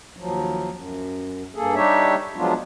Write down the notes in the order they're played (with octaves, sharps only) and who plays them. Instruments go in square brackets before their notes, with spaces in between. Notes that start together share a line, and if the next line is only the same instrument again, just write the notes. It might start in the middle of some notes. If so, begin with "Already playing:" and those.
[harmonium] D#2 F3 F#3
F#2
G2 A#3 G#4 A4
G3 D4 D#4 G4 C#5 E5
F3 F#3 G#3 B3 D4 F4